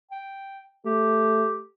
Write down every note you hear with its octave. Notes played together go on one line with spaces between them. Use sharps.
G5
A3 G4